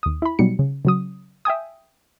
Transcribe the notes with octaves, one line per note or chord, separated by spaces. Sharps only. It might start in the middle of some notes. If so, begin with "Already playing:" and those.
D#2 D#6
E4 B5
B2 F#3 G3 D#4 C#7
C#3
C#3 F#3 D#6
E5 G5 G#5 D#6